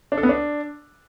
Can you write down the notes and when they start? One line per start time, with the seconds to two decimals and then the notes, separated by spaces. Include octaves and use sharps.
0.12 D4
0.18 A4
0.23 B3
0.29 D4